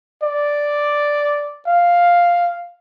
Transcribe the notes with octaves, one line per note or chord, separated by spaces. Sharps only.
D5
F5